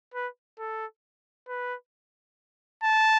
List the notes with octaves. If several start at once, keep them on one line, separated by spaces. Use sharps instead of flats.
B4
A4
B4
A5